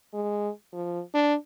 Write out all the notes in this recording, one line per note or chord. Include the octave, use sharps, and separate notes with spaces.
G#3
F3
D4